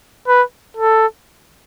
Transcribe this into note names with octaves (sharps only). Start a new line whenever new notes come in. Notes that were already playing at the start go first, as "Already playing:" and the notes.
B4
A4